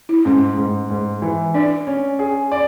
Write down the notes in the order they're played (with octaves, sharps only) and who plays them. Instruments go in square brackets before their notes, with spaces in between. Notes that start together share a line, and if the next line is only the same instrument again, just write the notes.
[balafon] E4
[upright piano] G#2 [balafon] C#4
[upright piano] G#2
G#2
E3
[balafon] D4 [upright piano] D5
[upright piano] C#4
G#4
D5